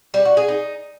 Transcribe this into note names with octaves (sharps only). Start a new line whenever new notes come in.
G3
F#4
G#4
D#4